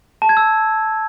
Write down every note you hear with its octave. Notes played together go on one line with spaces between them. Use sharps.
A5
G#6
E6